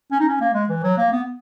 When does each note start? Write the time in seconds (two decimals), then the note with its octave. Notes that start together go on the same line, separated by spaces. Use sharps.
0.12 C#4
0.20 D#4
0.28 C#4
0.40 A#3
0.54 G#3
0.69 E3
0.83 F#3
0.97 A#3
1.12 B3